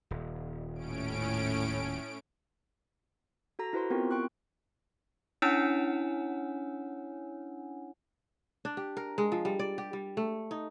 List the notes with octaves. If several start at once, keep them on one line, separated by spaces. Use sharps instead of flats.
D#1
A2 C#4 D7
F#4 A4 A#5 A#6
E4 F#4 B4 C5 A#5 C6
B3 C4 E4 F4 G4 A#4
G5 C6 C#6 F#6
C#4 D4 E4 C#5 F#5 G#5
D4
G4
A#4
G#3
F3
G3
D5
G4
G3
A3
D#4